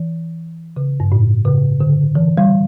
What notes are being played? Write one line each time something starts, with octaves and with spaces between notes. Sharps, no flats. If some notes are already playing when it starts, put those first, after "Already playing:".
Already playing: E3
C#3
G2
A2
C#3
D3
E3
G3